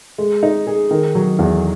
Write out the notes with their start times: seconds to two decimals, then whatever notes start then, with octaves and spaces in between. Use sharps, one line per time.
0.18 G#3
0.43 D#4
0.67 G#4
0.91 D#3
1.15 F#3
1.39 E2